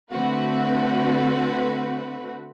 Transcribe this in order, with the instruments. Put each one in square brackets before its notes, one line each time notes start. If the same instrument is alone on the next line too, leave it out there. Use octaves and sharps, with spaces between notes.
[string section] D3 A3 C4 F#4 B4